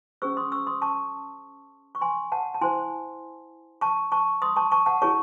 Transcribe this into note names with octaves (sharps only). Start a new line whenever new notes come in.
C#4 G#4 C5 C#6 E6
C6 D#6
C#6 E6
C6 D#6
A5 C#6
C#6
G#5 C6
F#5 A5
A5
E4 C5 G#5 C6
A5 C#6
A5 C#6
C6 D#6
A5 C#6
A5 C#6
F#5 A5
E4 G#4 C#5 A5 C#6